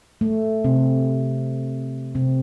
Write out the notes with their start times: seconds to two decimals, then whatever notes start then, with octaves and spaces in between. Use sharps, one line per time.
0.21 A3
0.64 C3 C4
2.15 C3 C4